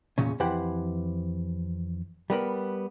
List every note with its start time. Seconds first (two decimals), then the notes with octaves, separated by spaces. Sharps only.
0.18 E2 A#2 C#3 C#4
0.40 F2 E3 G4 C5 F#5 B5
2.30 G3 B3 A#4 B5